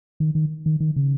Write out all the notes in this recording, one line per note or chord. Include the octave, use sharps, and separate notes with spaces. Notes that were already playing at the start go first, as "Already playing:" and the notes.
D#3
D#3
D#3
D#3
C#3